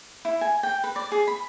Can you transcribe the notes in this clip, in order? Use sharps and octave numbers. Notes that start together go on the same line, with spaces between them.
E4
G#5
G5
B4
D5
G#4
B5